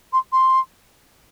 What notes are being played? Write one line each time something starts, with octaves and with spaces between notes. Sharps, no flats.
C6
C6